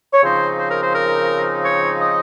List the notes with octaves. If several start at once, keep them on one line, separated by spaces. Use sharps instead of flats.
C#5
C#3 F3 C4 D#4 C5
C5
A#4
C5
A#4
C#5
D#5